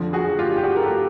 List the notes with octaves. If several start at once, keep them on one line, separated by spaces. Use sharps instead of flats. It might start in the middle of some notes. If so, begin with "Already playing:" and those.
Already playing: F2 D3 F3
F#4 G#4
F4 G4
G4
F#4 G#4
A#4
G4 A4